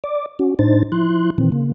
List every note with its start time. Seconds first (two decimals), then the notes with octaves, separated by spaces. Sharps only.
0.04 D5 D6
0.39 C#4 F#4
0.59 A2 D4 D#4 C5 A6
0.92 F3 E4 C6 F#6
1.38 A#2 D#3 E3 C4
1.52 C#3 A#3